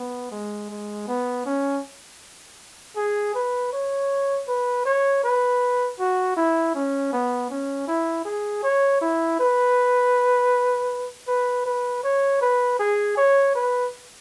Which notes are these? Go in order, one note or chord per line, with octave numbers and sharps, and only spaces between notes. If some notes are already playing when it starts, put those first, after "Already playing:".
Already playing: B3
G#3
G#3
B3
C#4
G#4
B4
C#5
B4
C#5
B4
F#4
E4
C#4
B3
C#4
E4
G#4
C#5
E4
B4
B4
B4
C#5
B4
G#4
C#5
B4